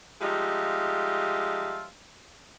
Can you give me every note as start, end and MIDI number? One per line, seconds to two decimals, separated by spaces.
0.21 1.85 53
0.21 1.85 55
0.21 1.85 56
0.21 1.85 63
0.21 1.85 65
0.21 1.85 76